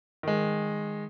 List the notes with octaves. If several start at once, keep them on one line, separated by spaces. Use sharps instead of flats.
D#3 G#3